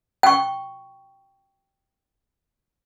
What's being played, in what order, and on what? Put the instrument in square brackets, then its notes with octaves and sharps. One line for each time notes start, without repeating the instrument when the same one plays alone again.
[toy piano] G5 C#6